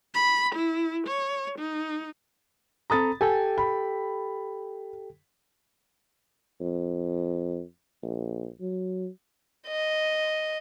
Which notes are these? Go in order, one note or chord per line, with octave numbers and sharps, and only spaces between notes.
B5
E4
C#5
D#4
C4 A4 A#5 B5 D#6 A6
G4 A4 G5 G#5
B5
F2
A#1
F#3
D#5